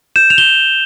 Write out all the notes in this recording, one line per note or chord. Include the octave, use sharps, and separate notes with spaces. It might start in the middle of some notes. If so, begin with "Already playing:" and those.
G6 E7
F7
G7